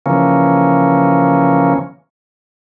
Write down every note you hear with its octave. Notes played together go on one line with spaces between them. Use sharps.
C#3 E3 F3 A#3 C#4